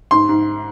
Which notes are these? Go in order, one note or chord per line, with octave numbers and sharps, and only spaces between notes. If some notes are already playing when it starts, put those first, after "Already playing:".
G#2 C6
G#2